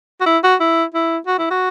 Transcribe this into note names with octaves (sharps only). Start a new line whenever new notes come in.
F#4
E4
F#4
E4
E4
F#4
E4
F#4